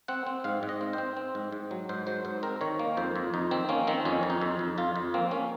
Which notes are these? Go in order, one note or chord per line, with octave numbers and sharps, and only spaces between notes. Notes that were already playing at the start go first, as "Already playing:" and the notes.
C4 F#5
C4
G#2 F5
G#2
D#5
C4
C4 C5
C4
G#2
G#2
F#3
G#2 C5
F#3 C5
G#2 C5
C4 A#4
D#3 C#5
A#3
F2 C5
F2
F2 D#4
D#3 C4
A#3 C#4
D#3 C4
F2 C#4
F2
D#4
F2
F2
F2 F4
F2
A#3 C4
A#3 C#4